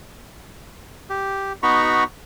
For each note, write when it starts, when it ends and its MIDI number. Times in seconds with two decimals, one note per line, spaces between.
1.10 1.53 67
1.63 2.04 59
1.63 2.04 63
1.63 2.04 66
1.63 2.04 82
1.63 2.04 83
1.63 2.04 85